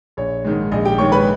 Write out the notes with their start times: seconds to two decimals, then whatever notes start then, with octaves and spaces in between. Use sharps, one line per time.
0.17 A#1 C#5
0.44 G#2 D#3 G#3
0.72 A#1 D#5
0.85 G4 G5
0.98 G#2 D#3 G#3 C#5 C#6
1.12 B4 B5